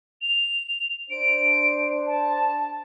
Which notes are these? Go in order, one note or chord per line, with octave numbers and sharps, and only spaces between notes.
F7
D4 C5 D7
A5